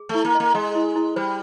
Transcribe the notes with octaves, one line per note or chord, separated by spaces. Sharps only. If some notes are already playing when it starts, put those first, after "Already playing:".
Already playing: G#4
A3
E4
A#3
D#5
A#3
G#3 D#5
E4
E4
G3 C5